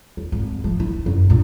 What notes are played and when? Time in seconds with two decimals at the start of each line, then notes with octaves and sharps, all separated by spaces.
0.17 D#2
0.32 G#1
0.64 F3 A3
0.80 E4
1.06 F#2
1.30 A#2 D4